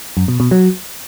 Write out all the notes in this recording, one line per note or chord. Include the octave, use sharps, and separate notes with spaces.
F#2
B2
B2
F#3